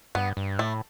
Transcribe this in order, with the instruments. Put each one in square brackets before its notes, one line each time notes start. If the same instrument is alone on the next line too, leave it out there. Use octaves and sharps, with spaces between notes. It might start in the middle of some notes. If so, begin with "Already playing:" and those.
[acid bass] G2 [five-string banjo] B3
[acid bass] G2
[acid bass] A2 [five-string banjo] A3